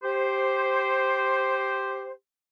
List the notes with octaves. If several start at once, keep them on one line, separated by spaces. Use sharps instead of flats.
G4 C5